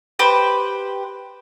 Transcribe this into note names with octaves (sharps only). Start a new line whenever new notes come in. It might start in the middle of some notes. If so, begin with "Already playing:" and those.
G4 B4 C5